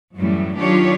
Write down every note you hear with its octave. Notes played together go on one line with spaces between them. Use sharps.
F#2 A2 E3 F#3 G3
D#3 F#3 D4 F4 G4 C#5